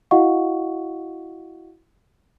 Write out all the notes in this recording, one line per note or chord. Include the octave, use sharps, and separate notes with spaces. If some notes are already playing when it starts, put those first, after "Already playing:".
E4 F#4 D#5 F5 F#5 C#6